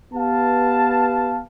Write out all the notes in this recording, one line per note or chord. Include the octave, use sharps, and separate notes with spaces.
B3 G4 B4 F5 A5